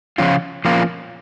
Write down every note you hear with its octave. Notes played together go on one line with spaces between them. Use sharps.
C#3 F3 C#4 F4
F3 A#3 C#4 F4